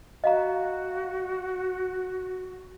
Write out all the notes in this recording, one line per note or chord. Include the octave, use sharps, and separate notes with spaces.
F#4 D#5 F5 A#5